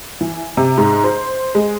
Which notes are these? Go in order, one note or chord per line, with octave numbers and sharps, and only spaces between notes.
E3
C3
G#2
C5
G#3